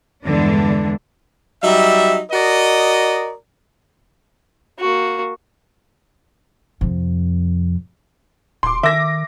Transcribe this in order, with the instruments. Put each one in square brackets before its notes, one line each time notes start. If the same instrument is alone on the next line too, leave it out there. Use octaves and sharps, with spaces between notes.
[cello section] E2 G2 D3 E3 G#3 D4
[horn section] F#3 G3 D#4 E5
F#4 A#4 D5 D#5
[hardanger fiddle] A#3 F#4
[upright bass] F2 C3
[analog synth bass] D#1 [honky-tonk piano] C6 D6
[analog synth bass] D#3 [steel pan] E5 [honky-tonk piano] D6 A#6